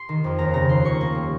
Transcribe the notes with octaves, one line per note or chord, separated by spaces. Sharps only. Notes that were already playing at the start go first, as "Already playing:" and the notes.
Already playing: C6
D#3
F2
D#2 A#5
C#3 A#5
D#2 C6
A#3 C#6
A#3
G3